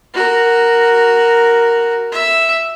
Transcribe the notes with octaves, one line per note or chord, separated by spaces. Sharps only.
F#4 A#4
E5